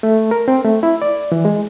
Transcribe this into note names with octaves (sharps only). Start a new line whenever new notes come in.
A3
A#4
C4
A3
E4
D5
E3
G#3